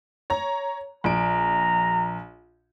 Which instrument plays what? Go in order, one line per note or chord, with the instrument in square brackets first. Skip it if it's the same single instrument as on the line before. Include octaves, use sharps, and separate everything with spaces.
[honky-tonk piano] C#5 A#5
[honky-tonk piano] A#1 D7 [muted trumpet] A#5